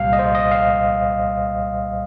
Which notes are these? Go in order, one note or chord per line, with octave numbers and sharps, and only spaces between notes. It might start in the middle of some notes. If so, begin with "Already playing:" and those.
Already playing: C2 A#2 G3 F5
D#5
C5
D#5
F5